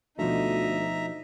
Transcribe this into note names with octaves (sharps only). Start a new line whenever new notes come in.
D2 B2 F3 A3 D#4 E5 A#5